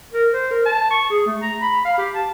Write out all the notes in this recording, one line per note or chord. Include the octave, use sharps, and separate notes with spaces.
A#4
C5
A#4
A5
C#6
G#4
A3
A#5
B5
F5
G4
A5